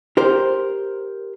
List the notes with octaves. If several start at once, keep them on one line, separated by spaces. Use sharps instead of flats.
G4 A#4 C5